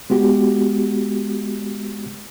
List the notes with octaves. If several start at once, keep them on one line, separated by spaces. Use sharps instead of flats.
G#3 B3 F#4 G4